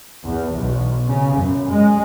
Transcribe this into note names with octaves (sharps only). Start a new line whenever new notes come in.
E2
B1
C#3
F#2
G#3